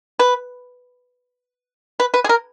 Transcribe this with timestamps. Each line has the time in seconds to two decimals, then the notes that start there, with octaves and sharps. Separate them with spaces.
0.19 B4
2.00 B4
2.14 B4
2.24 G#4
2.29 A#4